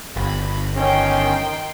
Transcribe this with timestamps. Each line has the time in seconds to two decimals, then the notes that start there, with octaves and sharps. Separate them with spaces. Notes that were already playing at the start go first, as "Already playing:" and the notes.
0.16 G1 B5
0.76 D#3 C#4 G5 C6